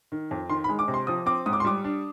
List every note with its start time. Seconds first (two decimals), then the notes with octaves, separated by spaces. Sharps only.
0.12 D#3
0.31 F2
0.50 D#3 C6
0.64 B5
0.69 G#3
0.79 D6
0.88 C3
0.94 C6
1.07 F3 D#6
1.26 C4 D6
1.46 G#2 D#6
1.53 D6
1.60 C6
1.65 G3 D6
1.84 D4